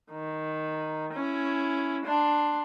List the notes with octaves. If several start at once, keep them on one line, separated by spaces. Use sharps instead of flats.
D#3
C#4 E4
D4 C6